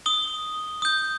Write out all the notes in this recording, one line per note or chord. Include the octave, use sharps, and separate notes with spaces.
D#6 G7
D#6 G6